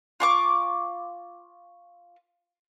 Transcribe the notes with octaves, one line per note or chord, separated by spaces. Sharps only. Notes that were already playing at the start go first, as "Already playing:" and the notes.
F4 C#6 D6